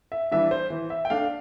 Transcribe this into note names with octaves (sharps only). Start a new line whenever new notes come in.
E5
E3 G3 D4 E5
C5
E3
E5
G5
A3 D4 F5